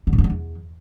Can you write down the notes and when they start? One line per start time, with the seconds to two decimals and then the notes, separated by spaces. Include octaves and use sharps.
0.07 D3
0.13 A2
0.18 G2
0.24 D3
0.30 E2